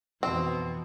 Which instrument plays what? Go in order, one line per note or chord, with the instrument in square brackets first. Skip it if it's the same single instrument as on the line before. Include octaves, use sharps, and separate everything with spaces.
[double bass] F2 E3 [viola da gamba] B2 [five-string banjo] C4